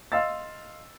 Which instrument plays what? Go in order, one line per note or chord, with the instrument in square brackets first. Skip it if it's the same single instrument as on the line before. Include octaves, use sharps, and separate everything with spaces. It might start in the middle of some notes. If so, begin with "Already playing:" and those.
[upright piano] D#5 F5 C6 E6 A6